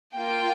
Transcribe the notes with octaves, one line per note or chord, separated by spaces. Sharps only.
A#3 F4 G5